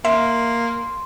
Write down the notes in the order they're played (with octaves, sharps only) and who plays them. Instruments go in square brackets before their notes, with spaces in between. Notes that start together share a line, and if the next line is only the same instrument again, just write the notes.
[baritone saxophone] A#3 [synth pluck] E5 [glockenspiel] C6